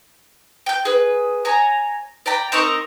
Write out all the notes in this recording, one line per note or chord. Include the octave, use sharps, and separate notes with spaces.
G5 G6
G#4 B4
C#5 G#5 A#5
D5 G5 A#5 B5
C4 D#4 A#4 C#6